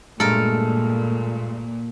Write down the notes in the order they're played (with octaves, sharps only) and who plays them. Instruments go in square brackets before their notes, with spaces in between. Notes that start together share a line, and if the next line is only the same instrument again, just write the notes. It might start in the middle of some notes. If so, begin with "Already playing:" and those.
[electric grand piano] G2 G#3 A3 [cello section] A#2 [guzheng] A4 A#4